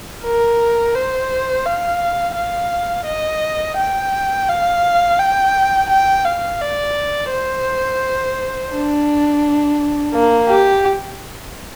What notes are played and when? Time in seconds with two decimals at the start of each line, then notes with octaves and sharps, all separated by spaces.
0.24 A#4
0.94 C5
1.65 F5
2.36 F5
3.07 D#5
3.78 G5
4.49 F5
5.19 G5
5.89 G5
6.25 F5
6.61 D5
7.31 C5
8.73 D4
10.14 A#3
10.49 G4